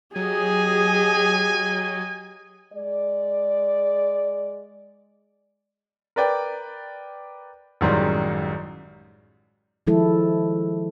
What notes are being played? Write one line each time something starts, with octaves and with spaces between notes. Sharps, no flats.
F#3 G4 G#4 D#5 G#5
G#3 D5
A#4 B4 D5 G5
A1 F#2 D#3 G3 G#3 C6
D#3 F3 G#3 E4 A4